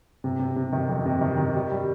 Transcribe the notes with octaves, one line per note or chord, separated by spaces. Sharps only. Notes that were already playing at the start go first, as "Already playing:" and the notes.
C3
C3
C3
D#3
F2
C3
D#3
D#3
G3
G3